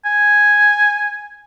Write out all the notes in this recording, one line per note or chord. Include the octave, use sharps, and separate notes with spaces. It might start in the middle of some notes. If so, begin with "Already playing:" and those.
G#5